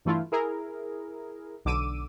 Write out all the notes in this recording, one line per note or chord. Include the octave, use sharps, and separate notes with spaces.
G2 E3 A3 E4 F4
E4 G#4 A#4
B1 D3 D6 E6 D#7